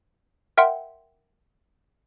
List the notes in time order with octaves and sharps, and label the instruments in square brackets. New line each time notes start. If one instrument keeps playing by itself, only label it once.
[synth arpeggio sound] A#4 E5 F#5 G5 C6